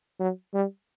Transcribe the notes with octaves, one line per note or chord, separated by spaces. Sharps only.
F#3
G3